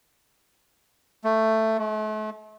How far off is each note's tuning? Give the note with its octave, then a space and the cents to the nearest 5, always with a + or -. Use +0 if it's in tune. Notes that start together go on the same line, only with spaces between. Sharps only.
A3 +10
A3 -40